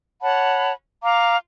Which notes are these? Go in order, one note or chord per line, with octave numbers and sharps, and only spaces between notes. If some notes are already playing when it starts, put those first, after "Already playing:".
C#5 F#5 A5 B5
F5 A#5 D6